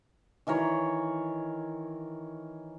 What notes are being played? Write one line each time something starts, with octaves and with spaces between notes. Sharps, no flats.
D#3 E3 A#4 C#5